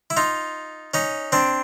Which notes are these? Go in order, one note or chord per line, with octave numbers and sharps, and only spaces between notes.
E4
D#4 F4
C#4 D#4
C4 D4